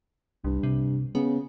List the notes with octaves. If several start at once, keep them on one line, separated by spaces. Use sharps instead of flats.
C2 G2
C3
C#3 B3